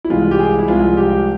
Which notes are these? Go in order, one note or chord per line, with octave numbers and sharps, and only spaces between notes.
E4
C2 C3 E3 G#3 F4
G4
G#4
E4
C2 C3 F3 G#3 F4
G4